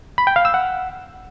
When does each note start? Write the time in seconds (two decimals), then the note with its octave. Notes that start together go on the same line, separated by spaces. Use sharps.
0.18 B5
0.27 G5
0.36 F5
0.45 E6
0.54 F#5